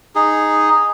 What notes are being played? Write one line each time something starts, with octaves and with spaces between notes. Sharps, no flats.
D#4 G#4